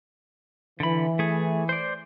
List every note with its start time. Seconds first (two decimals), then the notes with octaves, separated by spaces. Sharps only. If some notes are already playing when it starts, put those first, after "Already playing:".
0.80 D3 E3 B5
1.19 A3 G#4
1.69 C5 D5